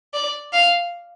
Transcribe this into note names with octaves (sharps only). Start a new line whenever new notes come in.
D5
F5